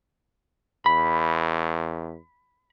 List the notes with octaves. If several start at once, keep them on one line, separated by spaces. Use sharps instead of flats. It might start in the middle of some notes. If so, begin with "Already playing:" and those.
E2 B5